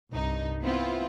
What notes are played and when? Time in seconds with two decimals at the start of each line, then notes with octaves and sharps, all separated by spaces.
0.11 C2 G2 D#4
0.62 B3 C4 E4 F4